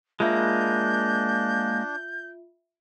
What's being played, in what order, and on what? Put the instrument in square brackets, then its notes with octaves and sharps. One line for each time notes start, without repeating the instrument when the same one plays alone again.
[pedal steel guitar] G#3 A#3 [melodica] D4 [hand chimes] F4 E5 [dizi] G6